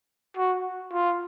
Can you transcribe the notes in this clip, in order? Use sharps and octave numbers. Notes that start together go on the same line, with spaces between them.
F#4
F4